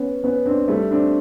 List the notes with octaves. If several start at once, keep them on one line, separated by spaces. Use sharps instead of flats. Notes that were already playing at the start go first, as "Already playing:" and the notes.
Already playing: B3 C#4
B3 C#4
C4 D4
G3 A3
C4 D4